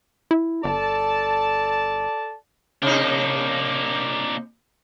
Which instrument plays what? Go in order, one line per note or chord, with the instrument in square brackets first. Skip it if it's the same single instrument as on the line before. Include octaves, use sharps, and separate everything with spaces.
[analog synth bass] E4
[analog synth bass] G1 [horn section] A4 D5 A5
[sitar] C3 D#4 [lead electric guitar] A#3 D4